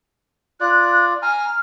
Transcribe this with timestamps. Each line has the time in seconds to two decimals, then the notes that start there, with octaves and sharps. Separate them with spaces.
0.60 F4 D5 F#6
1.22 G#5 A#5 F6